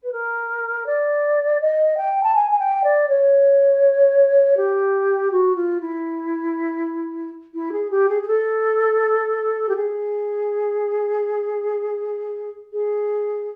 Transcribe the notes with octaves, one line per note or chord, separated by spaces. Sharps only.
B4
A#4
D5
D#5
G5
A5
G#5
G#5
G5
D5
C#5
G4
F#4
F4
E4
E4
G#4
G4
G#4
G#4
A4
G4
G#4
G#4